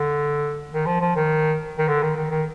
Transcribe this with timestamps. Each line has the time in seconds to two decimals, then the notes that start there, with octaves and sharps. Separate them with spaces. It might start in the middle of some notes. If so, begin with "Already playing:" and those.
Already playing: D3
0.72 D#3
0.86 F3
1.01 F3
1.16 D#3
1.78 D#3
1.88 D3
2.02 D#3
2.16 D#3
2.31 D#3